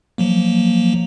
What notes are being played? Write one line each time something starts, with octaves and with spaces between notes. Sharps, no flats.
F3 F#3 A#3